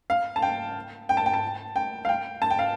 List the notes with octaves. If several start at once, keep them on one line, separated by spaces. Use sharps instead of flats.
F5
A5
G5
G5
A5
G5
A5
G5
F5
G5
A5
G5
F5